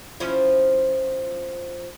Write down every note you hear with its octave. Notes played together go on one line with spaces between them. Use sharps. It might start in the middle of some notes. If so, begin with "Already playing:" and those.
F3 C#4 E4